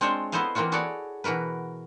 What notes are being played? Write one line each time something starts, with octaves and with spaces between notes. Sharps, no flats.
G#3 C4 D4 F4 C5 C#5
B3 E4 A4 C5 D#5 F5
E3 A#3 C4 F4 F#4
E4 F#4 G#4 A4 C#5 D5
B2 E3 F#4 A#4 B4